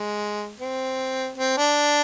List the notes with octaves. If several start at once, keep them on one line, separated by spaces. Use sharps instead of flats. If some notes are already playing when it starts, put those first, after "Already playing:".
Already playing: G#3
C4
C4
D4